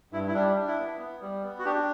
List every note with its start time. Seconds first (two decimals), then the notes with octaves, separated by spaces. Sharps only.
0.12 G2 E4
0.28 E4
0.34 G3 D4
0.56 D4
0.67 E4
0.79 B3
0.99 B3
1.22 G3
1.43 B3
1.59 F#4
1.65 D4 G4